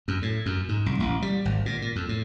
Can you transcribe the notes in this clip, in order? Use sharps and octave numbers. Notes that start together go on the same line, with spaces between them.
F#2
A2
F#2
G#2
C2
A1
G3
G#1
A#2
A#2
F2
A2